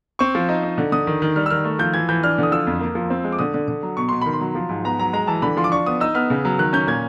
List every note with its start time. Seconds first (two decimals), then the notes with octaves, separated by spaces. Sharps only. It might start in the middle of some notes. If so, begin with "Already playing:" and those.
0.19 C4 C#6
0.35 F3
0.49 D#4
0.63 D#4
0.78 D3
0.92 D3 D#6
1.07 D#3
1.22 D#3
1.36 G3 F6
1.46 E6
1.50 D#3 F6
1.64 A3
1.79 F3 G6
1.94 E3 G#6
2.09 E3 G6
2.23 D4 F6
2.38 D3 D#6
2.52 F3 E6
2.67 F2
2.81 A#3
2.95 F3
3.10 C4
3.24 G#3
3.32 D6
3.39 D3 D#6
3.54 D3
3.68 D3
3.83 F#3
3.97 B2 C#6
4.09 B2 C6
4.22 D#3 B5
4.33 C6
4.41 F#3
4.55 F3
4.69 G#2
4.84 B3 A#5
4.99 F#3 A#5
5.13 G#3 A#5
5.27 E3 A5
5.42 D3 B5
5.57 F3 C6
5.64 D6
5.72 D4 C#6
5.86 B3 D#6
6.00 D#4 E6
6.14 B3 F6
6.30 C#3
6.45 F#3
6.59 D#3 F#6
6.73 C#4 G6
6.87 A#2 G#6